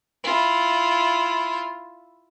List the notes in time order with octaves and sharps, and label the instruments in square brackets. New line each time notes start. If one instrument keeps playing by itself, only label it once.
[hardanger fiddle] E4 F4